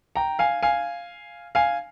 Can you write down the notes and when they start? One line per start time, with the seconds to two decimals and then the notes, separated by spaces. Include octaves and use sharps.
0.16 G5 A#5
0.39 F5 G#5
0.63 F5 G#5
1.55 F5 G#5